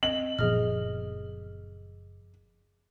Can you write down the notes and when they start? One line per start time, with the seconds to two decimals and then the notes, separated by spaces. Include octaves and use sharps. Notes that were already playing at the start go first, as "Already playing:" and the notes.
0.03 C4 D#5 F#7
0.39 F#1 A#2 F3 B3 G#4 D#5 F6